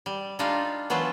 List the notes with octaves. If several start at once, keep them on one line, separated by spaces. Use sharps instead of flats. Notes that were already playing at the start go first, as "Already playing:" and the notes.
G3
G3 D4 D#4 F4 F5
E3 F#3 B3 F4 A5